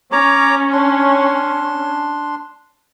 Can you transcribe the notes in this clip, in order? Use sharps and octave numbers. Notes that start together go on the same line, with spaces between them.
C#4 C#5 A#5 D6
D4 C6